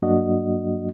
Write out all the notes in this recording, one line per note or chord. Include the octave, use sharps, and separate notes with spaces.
G2 F#3 A#3 D4 F#4 D#5